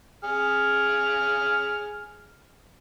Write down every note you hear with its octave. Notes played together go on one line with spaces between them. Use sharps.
G#4 F6